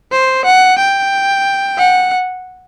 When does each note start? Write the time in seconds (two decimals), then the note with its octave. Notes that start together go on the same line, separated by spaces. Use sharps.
0.12 C5
0.45 F#5
0.79 G5
1.78 F#5